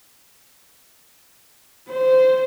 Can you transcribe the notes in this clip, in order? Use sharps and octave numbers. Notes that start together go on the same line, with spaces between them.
C5